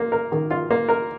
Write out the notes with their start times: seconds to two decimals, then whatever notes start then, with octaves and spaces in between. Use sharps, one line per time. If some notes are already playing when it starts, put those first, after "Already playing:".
Already playing: A#3
0.12 A#4
0.32 D#3
0.51 F4
0.71 A#3
0.88 A#4